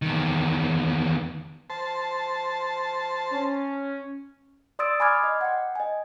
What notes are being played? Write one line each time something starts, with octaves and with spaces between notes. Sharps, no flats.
E2 D#3
C5 A5
C#4
D5 C6 D#6 E6 A6 D7
G#5 B5 C6 D6 F6 G#6
D#5
F#5 G5
D#5 G#5